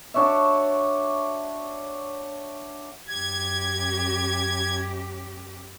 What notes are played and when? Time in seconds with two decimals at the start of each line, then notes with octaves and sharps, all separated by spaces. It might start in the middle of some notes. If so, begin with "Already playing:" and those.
0.14 D4 F#4 C#5 E5
3.08 F#2 G4 G#6